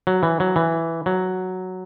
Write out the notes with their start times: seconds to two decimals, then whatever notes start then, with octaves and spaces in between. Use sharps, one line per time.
0.07 F#3
0.23 E3
0.40 F#3
0.56 E3
1.06 F#3